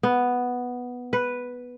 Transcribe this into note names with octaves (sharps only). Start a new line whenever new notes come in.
B3
B4